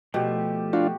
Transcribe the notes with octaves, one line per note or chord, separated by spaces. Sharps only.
B2 F3 A3 G4
D4 F4 F#4